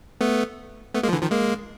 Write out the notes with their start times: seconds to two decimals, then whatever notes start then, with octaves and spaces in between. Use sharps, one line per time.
0.21 A3 B3
0.94 A3 B3
1.03 G#3 A#3
1.09 F3
1.13 D3 E3
1.21 D#3 F3
1.31 G#3 A#3